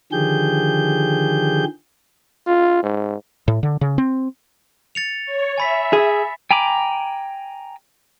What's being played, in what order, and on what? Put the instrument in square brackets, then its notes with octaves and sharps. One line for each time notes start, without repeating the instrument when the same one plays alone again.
[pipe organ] D3 D#3 F3 G4 G#4 G6
[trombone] F4
G#2
[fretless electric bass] A2
D3
C#3
C4
[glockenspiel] A6 C#7 F7
[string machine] C#5
[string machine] E5 [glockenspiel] G#5 B5 B6
[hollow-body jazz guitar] G#4
[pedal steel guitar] G5 G#5 A#5 B5 D6